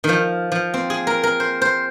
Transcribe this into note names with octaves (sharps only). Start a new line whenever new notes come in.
D#3
F3
F3
C4
G#4
A#4
A#4
C5
C5